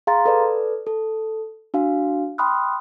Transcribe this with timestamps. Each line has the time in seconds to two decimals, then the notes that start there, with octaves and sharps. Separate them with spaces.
0.07 G#4 F5 A#5 C6 A6
0.26 A4 B4 D5
0.87 A4
1.74 D4 F#4 F5
2.38 G5 B5 C6 D#6 F6 F#6